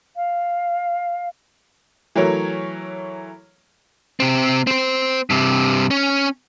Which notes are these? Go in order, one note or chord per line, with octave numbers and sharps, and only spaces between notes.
F5
E3 F#3 A3 A#4 C#5
C3 C4
C4 C5
G2 C3
C#4